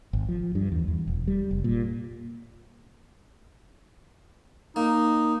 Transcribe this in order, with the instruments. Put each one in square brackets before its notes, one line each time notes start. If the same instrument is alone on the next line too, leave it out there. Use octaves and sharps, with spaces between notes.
[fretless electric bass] G#1
F3
G2
E2
E2
E1
G3
F1
A#2
[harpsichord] A#3 [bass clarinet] D#4